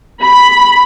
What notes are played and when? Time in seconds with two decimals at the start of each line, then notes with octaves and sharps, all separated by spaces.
0.21 B5